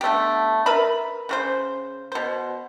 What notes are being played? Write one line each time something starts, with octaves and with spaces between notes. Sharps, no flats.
D3 A3 B3 G4
A#4 B4 E5 B5
C#3 F#4 C5
B2 C5